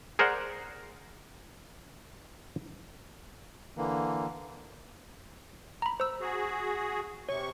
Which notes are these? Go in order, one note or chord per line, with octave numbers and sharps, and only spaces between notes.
G#4 A#4 C5 D5 F#5
D3 E3 A#3
A#5 B5
C5 E6
F#4 G#4
C3 C#5 C#6